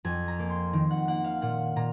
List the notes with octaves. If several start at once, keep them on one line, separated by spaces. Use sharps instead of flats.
F2 G#5
A#5
A#3
C6
D#3
F#5
A#3 F#5
F5
A#2 F#5
A#2 A#5